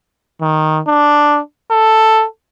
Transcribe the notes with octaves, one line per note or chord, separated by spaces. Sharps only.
D#3
D4
A4